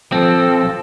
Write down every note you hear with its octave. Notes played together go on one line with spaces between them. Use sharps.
F3 C4 A4